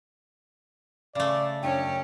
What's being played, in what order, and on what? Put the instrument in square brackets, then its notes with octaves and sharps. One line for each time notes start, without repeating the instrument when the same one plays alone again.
[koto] C#3 A3 [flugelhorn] D5
[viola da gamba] F#2 C#4 C#5 [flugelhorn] D4 [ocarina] G5